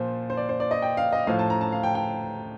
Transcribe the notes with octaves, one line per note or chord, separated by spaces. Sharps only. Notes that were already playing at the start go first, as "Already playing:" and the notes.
Already playing: A#2 F3 C5
C5
D5
C5
D5
D#5
G5
F5
D#5
A2 F3 F5
A5
A#5
A5
F5
G5
G5